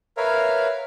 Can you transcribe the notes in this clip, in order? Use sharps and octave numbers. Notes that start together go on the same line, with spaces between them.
A#4 B4 C#5 E5 F5